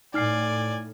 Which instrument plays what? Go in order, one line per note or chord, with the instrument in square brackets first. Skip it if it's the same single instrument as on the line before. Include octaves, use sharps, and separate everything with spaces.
[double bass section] A2 [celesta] D#4 F6 C7 [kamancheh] D5 G#5